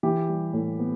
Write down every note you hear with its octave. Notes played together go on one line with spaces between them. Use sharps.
E3 G4
G3
A2
B3